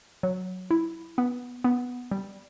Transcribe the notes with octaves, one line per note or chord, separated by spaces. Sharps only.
F#3
E4
B3
B3
G3